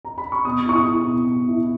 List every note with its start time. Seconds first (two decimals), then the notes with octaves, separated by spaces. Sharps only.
0.05 A#5
0.18 B5
0.32 C#6
0.45 B2 D#6
0.66 E4 C#6
0.76 D#6
0.85 E4
1.07 B2
1.26 B2
1.47 E4